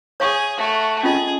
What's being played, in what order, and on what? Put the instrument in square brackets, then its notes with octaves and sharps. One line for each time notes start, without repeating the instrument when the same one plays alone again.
[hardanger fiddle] G#4 [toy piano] C#5 F5 C#6
[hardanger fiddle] A3 F#4
[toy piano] C#4 F4 D#5 [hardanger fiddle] G#4